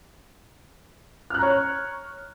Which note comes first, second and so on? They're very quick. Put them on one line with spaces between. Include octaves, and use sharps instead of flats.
F6 F#6 A#5 C#5